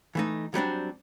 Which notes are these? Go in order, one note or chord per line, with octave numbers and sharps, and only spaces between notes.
E3 A3 D#4
F#3 G3 C4 D4